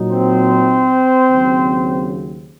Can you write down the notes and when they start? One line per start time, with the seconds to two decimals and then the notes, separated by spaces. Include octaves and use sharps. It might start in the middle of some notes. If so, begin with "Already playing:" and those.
Already playing: A#2 F#3 D#4
0.11 C4 C5
1.28 D#2 C#3 F#3